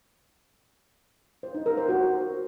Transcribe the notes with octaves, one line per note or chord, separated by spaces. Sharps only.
C5
D#4
A#4
C5
F#4